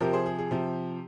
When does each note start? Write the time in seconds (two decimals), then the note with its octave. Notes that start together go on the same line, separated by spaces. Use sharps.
0.01 C3 F3 G4 A#4
0.13 G#4 C5
0.26 G#4
0.38 G#4
0.51 C3 F3 G4